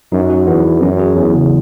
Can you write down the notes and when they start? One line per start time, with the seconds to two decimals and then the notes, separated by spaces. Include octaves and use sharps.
0.12 F#2 D#4
0.30 F#4
0.47 E2 B3
0.65 E3
0.82 F#2 C#4
1.00 G#4
1.17 E2 F#3
1.35 C#3